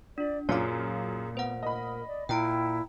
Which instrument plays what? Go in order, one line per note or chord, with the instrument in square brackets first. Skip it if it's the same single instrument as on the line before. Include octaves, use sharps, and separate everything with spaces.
[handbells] D4 F4 [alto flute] D5
[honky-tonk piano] F#2 F4 [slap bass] A#2 [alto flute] G#4 [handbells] C#5 D6
[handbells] A3 C5 F#5 [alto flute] B3
[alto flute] A#4 [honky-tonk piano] D#5 B5
[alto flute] D5
[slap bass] A#2 [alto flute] E4 [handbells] G5 A#5 D7